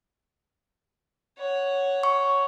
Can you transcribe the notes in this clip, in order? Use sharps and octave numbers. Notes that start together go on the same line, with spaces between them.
C#5 F#5
C#6